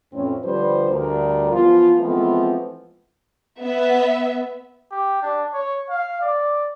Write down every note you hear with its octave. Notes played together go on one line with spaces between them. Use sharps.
F2 A2 E3 C4 C#4
D3 F3 G3 B4 C5
D2 G3 A#4
E3 F3 B3 F4
E3 F3 G#3 A3 B3 C4
B3 E5
G4
D4
C#5
F5
D5